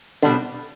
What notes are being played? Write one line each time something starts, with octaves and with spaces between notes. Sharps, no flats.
B2 D3 G3 D4